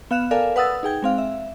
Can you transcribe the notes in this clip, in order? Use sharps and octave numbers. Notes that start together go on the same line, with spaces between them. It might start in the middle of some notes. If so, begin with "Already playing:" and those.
B3 F5 F#6 E7
A4 A#4 D5 F5 G#5
B4 F#5 D#6 E6 A6
D#4 G#4 G5 G#6
G#3 C4 F5
E5